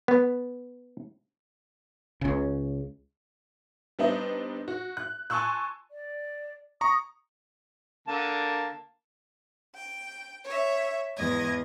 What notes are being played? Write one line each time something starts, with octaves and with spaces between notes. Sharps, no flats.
B3
C#2 C#3
G3 B3 C4 D4 D#4 D#5
F#4
F#6
G#5 A5 C6 C#6 E6 F#6
D5
A#5 C#6 D#6
D3 A#3 A5
G5
C#5 E5
E2 G#2 D#5 G#6